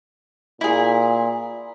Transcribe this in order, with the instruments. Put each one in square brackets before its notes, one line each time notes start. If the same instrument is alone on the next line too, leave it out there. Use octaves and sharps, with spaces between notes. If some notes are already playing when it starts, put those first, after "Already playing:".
[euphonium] A#2 [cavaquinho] E4 G#4